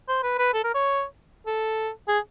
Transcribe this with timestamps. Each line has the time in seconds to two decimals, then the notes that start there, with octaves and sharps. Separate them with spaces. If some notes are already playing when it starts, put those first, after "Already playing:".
0.09 C5
0.23 B4
0.39 B4
0.54 A4
0.64 A#4
0.75 C#5
1.47 A4
2.08 G#4